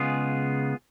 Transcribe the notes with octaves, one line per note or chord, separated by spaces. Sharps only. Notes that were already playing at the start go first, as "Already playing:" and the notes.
Already playing: C#3 G#3 B3 F4 G#4